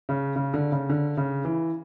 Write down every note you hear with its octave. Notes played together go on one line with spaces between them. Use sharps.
C#3
C#3
D3
C#3
D3
C#3
E3